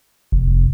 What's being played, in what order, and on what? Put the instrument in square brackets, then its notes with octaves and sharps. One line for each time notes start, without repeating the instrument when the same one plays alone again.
[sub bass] F1